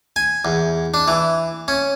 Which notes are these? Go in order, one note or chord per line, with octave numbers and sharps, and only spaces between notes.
G#5
E2
D4
E3
C#4